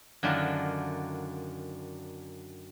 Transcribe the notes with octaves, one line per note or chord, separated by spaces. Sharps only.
F#2 D3 D#3 D4 F4 E5